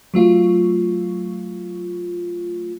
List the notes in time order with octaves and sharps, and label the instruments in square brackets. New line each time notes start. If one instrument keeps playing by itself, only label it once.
[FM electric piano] F#3 A3 F4